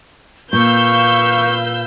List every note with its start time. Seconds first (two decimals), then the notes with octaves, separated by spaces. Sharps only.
0.53 A#2 B4 F5 C#6 E6 G6